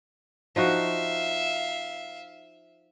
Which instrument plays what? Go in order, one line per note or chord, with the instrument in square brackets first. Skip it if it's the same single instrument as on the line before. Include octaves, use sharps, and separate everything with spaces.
[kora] F3 D#4 F#4 [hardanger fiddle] E5 F5